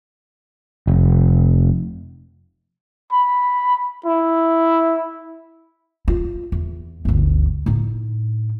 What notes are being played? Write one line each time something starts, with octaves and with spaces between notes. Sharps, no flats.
F1
B5
E4
F4
E2
G1 D2
A2 D#4